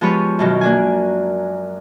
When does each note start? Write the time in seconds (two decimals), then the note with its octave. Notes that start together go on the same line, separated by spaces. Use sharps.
0.01 F3 G#3 B3 G4 B4 C#5
0.39 F#2 B2 D#3
0.61 A#3 D4 G#5